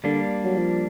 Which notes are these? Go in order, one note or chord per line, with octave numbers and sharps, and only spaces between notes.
D3 G3 A#3 D4
F#3
F3